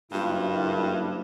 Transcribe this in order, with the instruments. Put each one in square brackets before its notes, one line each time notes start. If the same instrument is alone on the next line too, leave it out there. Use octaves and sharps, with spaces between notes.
[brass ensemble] F#1 E4 [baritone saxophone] G2 [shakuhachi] F4